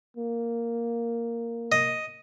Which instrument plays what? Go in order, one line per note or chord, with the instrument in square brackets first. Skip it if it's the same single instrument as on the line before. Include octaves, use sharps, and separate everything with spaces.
[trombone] A#3
[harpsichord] D#5